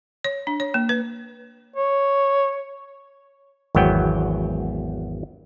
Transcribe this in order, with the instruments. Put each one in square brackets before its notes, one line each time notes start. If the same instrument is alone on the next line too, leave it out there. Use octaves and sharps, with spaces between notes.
[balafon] C#5
D4
C#5
A#3
B4
[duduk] C#5
[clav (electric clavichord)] G#1 E2 F#3 B3 G5